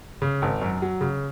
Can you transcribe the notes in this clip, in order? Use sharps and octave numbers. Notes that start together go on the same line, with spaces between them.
C#3
G#1
F#2
F#3
C#3